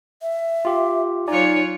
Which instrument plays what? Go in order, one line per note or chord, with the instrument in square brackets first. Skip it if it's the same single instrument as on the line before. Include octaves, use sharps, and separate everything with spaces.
[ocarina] E5
[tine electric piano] F4 G4
[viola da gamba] F#3 F4 C#5 [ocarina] D#4 [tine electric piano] D5 G#5 A#5